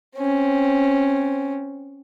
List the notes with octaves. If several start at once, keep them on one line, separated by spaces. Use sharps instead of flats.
C4 C#4